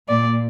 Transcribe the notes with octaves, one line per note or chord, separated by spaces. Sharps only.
A#2 D5